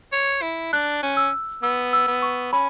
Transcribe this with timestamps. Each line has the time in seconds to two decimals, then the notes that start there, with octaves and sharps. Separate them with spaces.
0.12 C#5
0.42 E4
0.73 D4 F#6
1.03 C#4
1.17 E6
1.63 B3 E6
1.93 E6
2.08 B3
2.22 C#6
2.53 C#4 B5